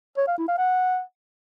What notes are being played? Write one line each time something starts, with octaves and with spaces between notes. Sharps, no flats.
C#5
F5
E4
F5
F#5